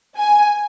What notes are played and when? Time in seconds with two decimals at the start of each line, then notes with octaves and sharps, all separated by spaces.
0.16 G#5